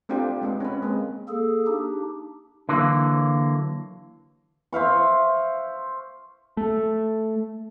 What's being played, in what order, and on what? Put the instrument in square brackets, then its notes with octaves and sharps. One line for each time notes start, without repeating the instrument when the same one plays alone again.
[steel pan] A3 C4 D4 F4 G4 C5
G#3 B3 C4
C#4 B4
G#3 A#3 C4
[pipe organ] A#3 G#4 A4
D4 D#4 G4
[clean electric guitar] D3 E3 F#3 A#3
[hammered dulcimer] C5 E5 F5 C#6
[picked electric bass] A3